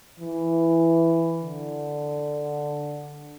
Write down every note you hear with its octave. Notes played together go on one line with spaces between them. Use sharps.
E3
D3